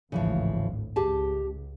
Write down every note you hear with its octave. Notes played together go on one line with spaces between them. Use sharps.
G#1 D2 A2 C#3 E3 F3
C#2 G4 G#4 A5